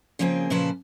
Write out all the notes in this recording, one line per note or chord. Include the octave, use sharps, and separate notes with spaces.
C#3 F3 A#3 C4 G#4
A#2 C#3 F3 B4 C5 A5